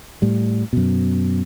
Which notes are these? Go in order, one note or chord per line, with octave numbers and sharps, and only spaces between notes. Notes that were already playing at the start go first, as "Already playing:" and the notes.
A2 G3
F#2 B2